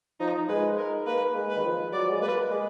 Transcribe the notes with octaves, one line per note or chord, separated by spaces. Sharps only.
F3 D#4
G#3 B4
A#4
A#3 B4
G#3
B4
D#3
F3
F#3 D5
G#3
A#3 B4
G#3